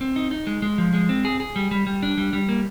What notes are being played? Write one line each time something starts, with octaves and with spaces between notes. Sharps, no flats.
C4
D#4
D#4
G#3
G#3
F3
G#3
C4
G#4
G#4
G3
G3
G3
D4
G3
G3
A#3